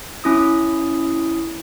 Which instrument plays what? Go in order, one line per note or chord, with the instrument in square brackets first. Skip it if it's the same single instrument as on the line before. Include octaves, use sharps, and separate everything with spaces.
[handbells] C#4 E4 D#6